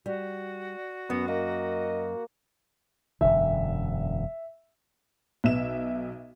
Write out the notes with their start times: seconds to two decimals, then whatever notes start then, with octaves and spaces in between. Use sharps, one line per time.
0.06 G3 F#4
1.10 F#2 B3
1.28 A#3 D#5
3.21 E1 F#2 D3 E5
5.44 B1 B3 E5 E7